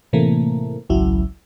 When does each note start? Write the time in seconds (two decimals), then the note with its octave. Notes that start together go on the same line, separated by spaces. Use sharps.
0.13 A2 C3 E3 A3 A#3
0.89 G#1 C#2 F#3 E4